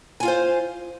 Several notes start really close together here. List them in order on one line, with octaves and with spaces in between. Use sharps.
G#5 F4 F5 C5